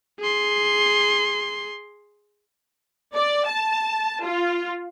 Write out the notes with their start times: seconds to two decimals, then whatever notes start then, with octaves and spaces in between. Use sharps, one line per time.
0.20 G#4 C6
3.13 D5
3.47 A5
4.23 F4